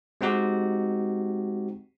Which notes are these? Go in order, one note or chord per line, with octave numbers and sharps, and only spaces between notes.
G#3 C4 D#4 F#4 G4